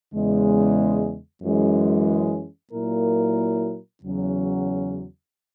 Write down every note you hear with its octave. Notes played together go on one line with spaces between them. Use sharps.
E2 C#3 G#3
F#2 E3 G#3 C#4
A#2 F#3 A#3 E4 A#4
E2 C#3 F#3 C#4